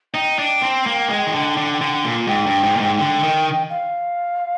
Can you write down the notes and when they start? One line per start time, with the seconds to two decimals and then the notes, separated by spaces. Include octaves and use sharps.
0.14 D#4 G5
0.39 D4
0.62 C4
0.86 A#3
1.09 G#3
1.26 D#3
1.33 D3
1.57 D3
1.81 D3
2.04 A#2
2.27 G#2 G5
2.46 G2
2.63 G#2
2.76 A#2
2.81 G#2
2.98 D3 G5
3.23 D#3
3.70 F5